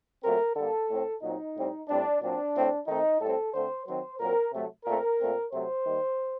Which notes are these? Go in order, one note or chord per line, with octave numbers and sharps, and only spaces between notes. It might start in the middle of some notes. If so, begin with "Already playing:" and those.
A#2 F#3 A3 C4 A#4
D3 G3 A#3 A4
A2 A3 C4
A#2 F#3 C4 D#4
A2 G3 C4
A2 G3 C4 D4
A#2 F#3 C4 D4
A2 A3 C4
D#3 A3 C4 D#4
A2 G3 C4 A4
D3 A3 C4 C5
D#3 F#3 C4 C5
A#2 F#3 C4 A#4
C3 F#3 A3
A#2 A3 C4 A#4
A#2 A3 C4
C3 F#3 A3 C4 C5
D#3 G3 A#3